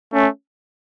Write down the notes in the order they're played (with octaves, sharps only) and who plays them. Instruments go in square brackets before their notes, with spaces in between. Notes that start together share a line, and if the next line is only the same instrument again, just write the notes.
[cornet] A3 [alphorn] C#4